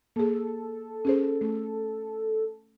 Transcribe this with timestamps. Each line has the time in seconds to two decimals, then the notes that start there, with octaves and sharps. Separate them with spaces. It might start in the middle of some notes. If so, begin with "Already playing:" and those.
0.16 A#3 G#4 A4
1.05 C#4 G#4 C5
1.41 A3